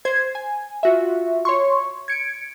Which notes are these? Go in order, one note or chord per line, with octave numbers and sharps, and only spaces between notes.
C5 G#6
G#5
F4 F#4 E5
C#5 C6 C#6
G#6 C#7 D7